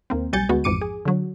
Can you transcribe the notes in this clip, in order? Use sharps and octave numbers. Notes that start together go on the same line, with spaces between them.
D#2 A#3 C4
B1 G3 G#5 G6 A6 C#7
D2 G#3 B3 F#4
A1 F2 G#2 D6 C#7 D#7
G#4
D3 F#3